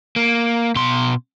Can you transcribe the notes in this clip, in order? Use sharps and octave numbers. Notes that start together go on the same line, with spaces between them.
A#3
B2 C6